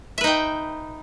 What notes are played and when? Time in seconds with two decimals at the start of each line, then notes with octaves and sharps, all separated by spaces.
0.18 E5
0.21 B4
0.24 D#4
0.27 G5